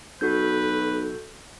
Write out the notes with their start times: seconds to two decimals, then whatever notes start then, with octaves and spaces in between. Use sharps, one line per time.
0.21 B1 F#4 A4 B4 G6